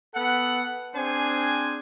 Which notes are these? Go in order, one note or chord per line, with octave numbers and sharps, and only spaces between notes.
B3 A4 F#5
C4 D4 G#4 C5 G#5